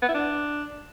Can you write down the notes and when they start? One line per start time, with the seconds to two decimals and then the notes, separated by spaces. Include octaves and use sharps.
0.02 B3
0.08 E4
0.15 D4